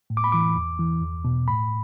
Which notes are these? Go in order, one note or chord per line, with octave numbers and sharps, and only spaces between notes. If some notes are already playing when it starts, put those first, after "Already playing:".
A2
D6
B5
E3 D6
E2
E3
E2
B2
A2 B5